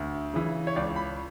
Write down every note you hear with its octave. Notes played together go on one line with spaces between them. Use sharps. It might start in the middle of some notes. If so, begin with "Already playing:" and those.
Already playing: D2
C#3 E3
C#5
C#2 D5
B5